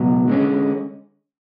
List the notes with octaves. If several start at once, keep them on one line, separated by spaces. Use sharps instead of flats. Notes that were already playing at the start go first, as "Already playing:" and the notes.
Already playing: C#2 B2 F#3
D3 G#3 C#4